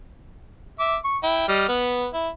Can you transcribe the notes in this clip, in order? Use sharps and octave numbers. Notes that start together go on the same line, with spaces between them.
E5 D6
C#6
E4 G5
G3 D#5 F6
B3 B4
E4